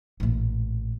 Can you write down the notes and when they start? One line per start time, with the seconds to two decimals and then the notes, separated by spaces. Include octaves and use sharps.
0.20 A1 A#2